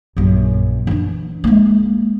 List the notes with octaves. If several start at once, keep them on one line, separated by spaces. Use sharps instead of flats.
A#1 F#2
E3 D4
G#3 A#3